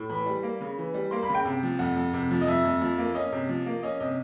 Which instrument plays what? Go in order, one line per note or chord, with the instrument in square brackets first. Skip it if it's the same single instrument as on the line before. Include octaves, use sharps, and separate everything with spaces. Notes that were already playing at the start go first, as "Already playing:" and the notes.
Already playing: [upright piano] A2
E3 B5
G3
A#3
C#3
E3
G3
A#3 C6
B5
C#3
G5
C3
F3
F2 F#5
F2
C3
F3
D#5
F2 E5
F2
F3
A#3
C#4 D#5
C3
F3
A#3
C#4 D#5
C3 D#5